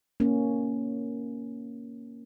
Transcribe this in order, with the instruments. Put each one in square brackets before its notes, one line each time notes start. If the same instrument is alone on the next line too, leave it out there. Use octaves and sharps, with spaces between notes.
[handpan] A#3 C#4